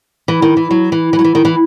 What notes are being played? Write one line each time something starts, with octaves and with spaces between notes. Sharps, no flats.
E3
D#3
E3
F#3
E3
E3
F#3
E3
D#3
E3